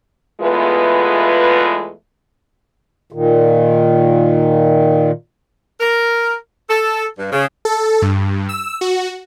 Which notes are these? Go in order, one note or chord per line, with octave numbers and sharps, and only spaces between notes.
E2 G#3 A3 B3 F4 B4
A#2 D#3
A#4
A4
G2
C#3
A4
G2
E6
F#4